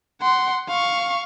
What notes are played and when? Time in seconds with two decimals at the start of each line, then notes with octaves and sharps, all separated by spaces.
0.22 F#5 C6
0.69 F5 C#6